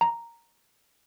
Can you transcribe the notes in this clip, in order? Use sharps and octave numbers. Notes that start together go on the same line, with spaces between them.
A#5